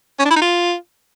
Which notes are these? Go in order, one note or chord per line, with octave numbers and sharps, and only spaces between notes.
C#4
D4
E4
D#4
F4